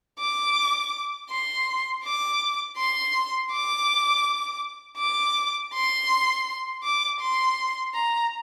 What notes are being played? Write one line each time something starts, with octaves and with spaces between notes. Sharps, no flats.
D6
C6
D6
C6
D6
D6
C6
D6
C6
A#5